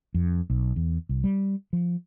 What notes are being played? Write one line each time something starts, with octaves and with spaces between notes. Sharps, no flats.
F2
B1
E2
C2
G3
F3